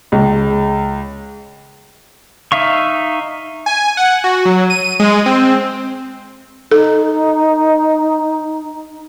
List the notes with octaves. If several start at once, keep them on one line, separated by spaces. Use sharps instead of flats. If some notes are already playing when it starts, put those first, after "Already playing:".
C#2
D#4 E5 F5 C#6
G#5
F#5
F#4
F#3
D#7
G#3
C4
D#4 A4